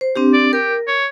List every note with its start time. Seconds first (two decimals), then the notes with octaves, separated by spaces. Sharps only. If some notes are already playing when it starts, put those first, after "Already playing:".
0.01 C5
0.16 C4 D4 G4
0.33 D5
0.53 G4 A#4
0.87 C#5